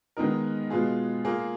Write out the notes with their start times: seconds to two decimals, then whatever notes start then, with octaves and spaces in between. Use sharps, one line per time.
0.17 D#3 G#3 B3 D#4 A#4
0.70 B2 G#3 B3 F4 G#4
1.25 A#3 F4 G#4